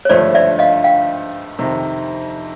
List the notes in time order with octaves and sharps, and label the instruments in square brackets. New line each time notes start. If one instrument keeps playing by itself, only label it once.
[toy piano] C#5
[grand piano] G#1 G2 D3 F3 A3 [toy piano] C5 D5
[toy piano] D5 E5
D#5 F5
F5 G5
[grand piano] F2 C3 D#3